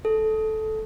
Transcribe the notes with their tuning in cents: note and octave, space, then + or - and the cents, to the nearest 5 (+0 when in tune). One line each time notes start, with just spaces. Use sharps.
A4 -10